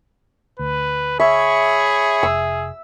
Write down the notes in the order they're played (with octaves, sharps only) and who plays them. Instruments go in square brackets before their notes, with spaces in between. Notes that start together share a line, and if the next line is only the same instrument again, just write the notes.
[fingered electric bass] D2 [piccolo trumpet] B4
[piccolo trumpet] G#4 [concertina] C#5 B5 C#6 [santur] E5
[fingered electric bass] F1 [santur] E6